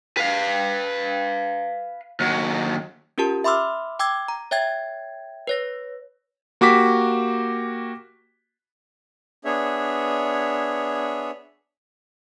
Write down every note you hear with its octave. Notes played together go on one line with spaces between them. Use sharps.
B4 F5
D#2 F#3
C#4 F4 G4 A#4 A5
E5 B5 C6 D6 E6 F6
G5 D6 E6 G#6
A#5
C#5 E5 G5 G#6 A6
B4 C#5 A#6
A#3 F#4 G4 D6 B6
B3 D4 G#4 C#5 E5